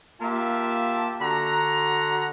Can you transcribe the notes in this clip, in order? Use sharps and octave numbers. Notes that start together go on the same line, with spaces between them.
A#3 F4 G4 E5 A5
D3 F#4 F#5 A#5